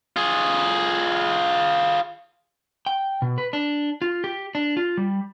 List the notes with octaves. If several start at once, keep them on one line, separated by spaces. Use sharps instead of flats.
F4 G#4
G5
B2
B4
D4
F4
G4
D4
F4
G3